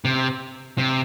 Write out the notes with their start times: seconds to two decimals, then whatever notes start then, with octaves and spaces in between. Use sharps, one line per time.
0.05 C3
0.78 C3